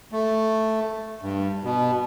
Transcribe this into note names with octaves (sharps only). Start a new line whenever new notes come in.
A3
G2
B2